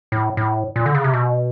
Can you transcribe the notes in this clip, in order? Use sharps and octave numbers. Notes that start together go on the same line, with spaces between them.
A2
A2
A#2
D3
C#3
C3
B2